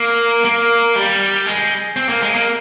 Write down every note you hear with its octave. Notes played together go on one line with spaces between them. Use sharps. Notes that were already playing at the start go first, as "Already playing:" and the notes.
Already playing: A#3
A#3
G3
G#3
C4
A#3
G#3
A#3